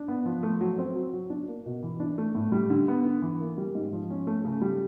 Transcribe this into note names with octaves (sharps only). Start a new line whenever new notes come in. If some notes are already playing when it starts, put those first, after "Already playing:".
Already playing: D4
B3
F3
A3
F#3
C4
F#3
F#3
D4
A#3
B2
E3
D4
A3
A2
G3
D3
B3
D3
E3
A#3
G3
G#2
F3
C#4
A3
C#3
G3